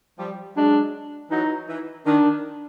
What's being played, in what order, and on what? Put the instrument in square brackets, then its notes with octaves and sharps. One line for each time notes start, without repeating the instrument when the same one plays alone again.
[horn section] F3 G3
[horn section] F#3 G#3 [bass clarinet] D4
[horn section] E3 F#3 [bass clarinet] D#4
[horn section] E3
[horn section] D#3 [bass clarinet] D4